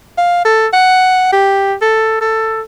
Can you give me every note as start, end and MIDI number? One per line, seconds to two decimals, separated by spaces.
0.18 0.44 77
0.45 0.67 69
0.73 1.28 78
1.32 1.74 67
1.82 2.20 69
2.21 2.62 69